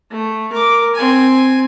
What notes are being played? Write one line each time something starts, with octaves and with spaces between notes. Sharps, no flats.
A3
A#4 D6
C4 G#5